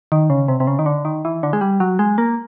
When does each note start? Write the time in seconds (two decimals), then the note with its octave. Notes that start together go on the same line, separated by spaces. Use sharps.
0.12 D#3
0.30 C#3
0.48 C3
0.60 C3
0.67 C#3
0.79 D#3
0.86 D3
1.05 D#3
1.25 E3
1.43 D3
1.53 G#3
1.61 G3
1.80 F#3
1.99 G#3
2.18 A#3